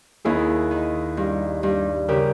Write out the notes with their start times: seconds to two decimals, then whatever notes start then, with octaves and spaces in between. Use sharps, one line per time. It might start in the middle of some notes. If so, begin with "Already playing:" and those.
0.25 D#2 E4 G#4
0.71 D#3
1.17 G2
1.63 G2
2.09 C#3 G4 A#4